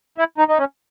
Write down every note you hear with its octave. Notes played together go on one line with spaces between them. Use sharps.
E4
D#4
D#4
C#4